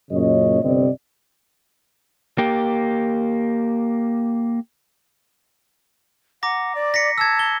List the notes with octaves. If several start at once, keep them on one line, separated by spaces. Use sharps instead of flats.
F#2 A#2 C#3 C#5 D#5
G1 C3 C4 D5 D#5
A#3 G4
F#5 A#5 D6 A#6
D5
A#6 B6 C#7
A5 E6 G#6
G7